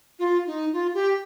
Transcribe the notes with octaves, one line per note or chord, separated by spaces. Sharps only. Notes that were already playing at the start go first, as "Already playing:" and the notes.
F4
D#4
F4
G4